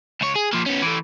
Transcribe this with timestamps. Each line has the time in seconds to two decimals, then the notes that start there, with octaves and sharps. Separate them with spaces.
0.21 C#2 C#5
0.36 G#4
0.53 F3 A#3
0.66 B3 C#4
0.82 E3 A3